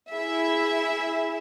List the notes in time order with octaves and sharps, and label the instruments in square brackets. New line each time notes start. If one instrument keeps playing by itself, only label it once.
[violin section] E4 G#4 E5